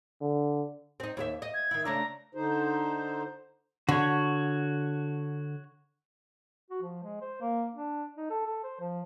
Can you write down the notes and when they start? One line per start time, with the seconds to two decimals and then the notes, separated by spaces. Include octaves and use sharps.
0.21 D3
1.00 C4 D#4
1.17 D#2 G4 E5
1.42 D#5
1.54 G#6
1.71 D#3 E4
1.85 C#3 A3 D4 A#5
2.35 D3 D#4 C5
3.89 D3 F#4 C#5
6.71 F#4
6.82 F3
7.04 G#3
7.21 C5
7.41 A#3
7.75 D4
8.17 D#4
8.30 A4
8.46 A4
8.64 C5
8.80 F3